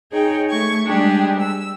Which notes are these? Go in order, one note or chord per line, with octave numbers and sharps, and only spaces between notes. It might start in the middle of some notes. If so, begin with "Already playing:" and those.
D#4 G#4 C#5 G5
A3 C#6 G#6
G3 G#3 D4 G4 G#4
E6